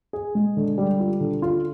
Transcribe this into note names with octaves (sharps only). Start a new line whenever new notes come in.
G#4
G#3
D3
G3
F4
D3
F4